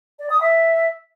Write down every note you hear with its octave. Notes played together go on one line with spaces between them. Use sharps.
D5
D#6
E5